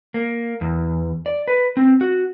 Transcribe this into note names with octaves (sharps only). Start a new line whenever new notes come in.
A#3
E2
D5
B4
C4
F#4